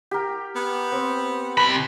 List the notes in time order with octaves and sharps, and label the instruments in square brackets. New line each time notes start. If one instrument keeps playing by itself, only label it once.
[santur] G4 A#4
[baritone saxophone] B3
[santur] C4
[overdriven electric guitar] C3 B5 [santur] B4